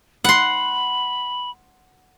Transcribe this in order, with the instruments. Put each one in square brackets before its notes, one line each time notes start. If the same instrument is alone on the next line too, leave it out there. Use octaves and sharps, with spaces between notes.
[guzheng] F#5 C6 [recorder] B5